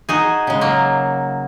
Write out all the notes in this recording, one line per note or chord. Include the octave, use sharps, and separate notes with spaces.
D#4 F#4 G#4
C#3 G#3
F#3 A#3